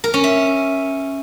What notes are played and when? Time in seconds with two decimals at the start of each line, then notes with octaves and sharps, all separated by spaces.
0.04 A#4
0.14 C#4
0.24 E5